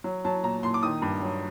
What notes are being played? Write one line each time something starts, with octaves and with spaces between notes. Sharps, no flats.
F#3
F#3 A5
A#2 A#5
A#2 C6
D6
D#3 D#6
G2
F#3